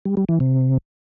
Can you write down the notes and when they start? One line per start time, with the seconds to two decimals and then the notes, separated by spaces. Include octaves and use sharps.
0.05 G3
0.17 G3
0.29 E3
0.40 C3